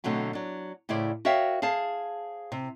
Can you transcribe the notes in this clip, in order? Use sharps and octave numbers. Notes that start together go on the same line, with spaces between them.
B2 D3 F#3 A3 C4
F#3 D4
A2 C#3 E4 C5 D5
F#4 A#4 C#5 E5 F5 G5
G#4 C5 F5 A5
C3